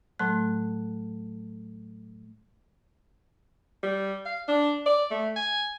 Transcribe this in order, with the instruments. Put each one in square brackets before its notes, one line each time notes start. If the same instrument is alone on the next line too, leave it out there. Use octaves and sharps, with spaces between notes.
[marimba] A2 F#3 A3 F#6
[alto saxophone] G3
F5
D4
D5
A3
G#5